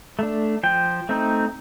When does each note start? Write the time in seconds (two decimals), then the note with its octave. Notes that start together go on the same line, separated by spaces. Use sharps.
0.19 A3 D4
0.63 F3 G5
1.09 A3 C4 D#4